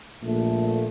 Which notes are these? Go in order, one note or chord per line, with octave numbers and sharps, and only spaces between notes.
A#1 A#2 A3